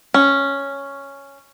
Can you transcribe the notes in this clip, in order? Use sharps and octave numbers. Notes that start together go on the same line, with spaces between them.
C#4